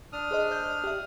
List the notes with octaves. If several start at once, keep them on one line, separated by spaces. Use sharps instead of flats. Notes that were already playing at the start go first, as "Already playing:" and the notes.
D4 D#6 F6
G#4 C5 D#5
D#5 G6
G4 E5